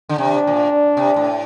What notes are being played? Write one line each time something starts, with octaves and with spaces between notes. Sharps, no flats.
D3
C3 D4
A#2
C3
A2